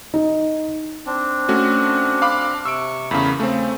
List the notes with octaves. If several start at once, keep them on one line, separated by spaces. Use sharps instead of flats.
D#4
C4 D4
A3 C#4 F#4
F5 B5 D6
C3 C#6 E6 D7
E2 C#3 A3 A#3 B5
C#3 A3 C4